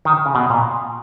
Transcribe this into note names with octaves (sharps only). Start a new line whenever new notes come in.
D#3
C#3
B2
A#2